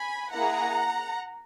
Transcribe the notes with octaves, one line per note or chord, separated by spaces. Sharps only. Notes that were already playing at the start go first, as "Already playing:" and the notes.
Already playing: G#5 B5
A#3 E4 G#4 F#5 A#5